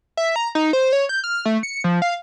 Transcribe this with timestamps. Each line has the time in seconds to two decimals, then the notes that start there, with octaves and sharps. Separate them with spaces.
0.17 E5
0.36 A#5
0.55 D#4
0.73 C5
0.93 C#5
1.09 G6
1.24 F6
1.45 A3
1.63 C#7
1.84 F3
2.02 F5